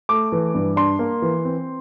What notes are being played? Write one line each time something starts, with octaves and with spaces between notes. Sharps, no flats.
A3 D6
E3
G2
D4 C6
A#3
E3
C4